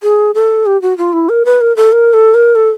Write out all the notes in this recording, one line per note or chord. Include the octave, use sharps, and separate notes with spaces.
G#4
A4
G4
F#4
F4
E4
A#4
B4
A#4
A4
A#4
A4
A#4
A4